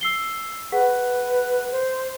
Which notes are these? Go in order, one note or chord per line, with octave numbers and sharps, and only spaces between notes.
E6 C7 G7
G#4 B4 F#5
C5